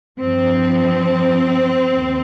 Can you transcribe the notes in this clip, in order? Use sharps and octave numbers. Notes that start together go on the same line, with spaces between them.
G2 F3 C4
D#2